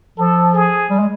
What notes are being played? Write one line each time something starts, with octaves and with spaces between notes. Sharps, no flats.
F3 A4
G#4
G3
G#3